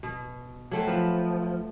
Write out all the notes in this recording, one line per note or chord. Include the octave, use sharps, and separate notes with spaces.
B2
F#3 A3 C4
F3 B4